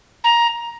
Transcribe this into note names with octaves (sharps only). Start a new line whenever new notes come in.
A#5